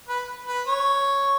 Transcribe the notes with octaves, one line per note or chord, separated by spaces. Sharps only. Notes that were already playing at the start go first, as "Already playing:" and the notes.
B4
B4
C#5